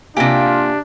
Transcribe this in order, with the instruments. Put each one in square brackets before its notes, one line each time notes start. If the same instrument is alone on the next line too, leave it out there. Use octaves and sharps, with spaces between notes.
[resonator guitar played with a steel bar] C3 G4 [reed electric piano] A#3 F5 G#5 [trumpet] D4 [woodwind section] F4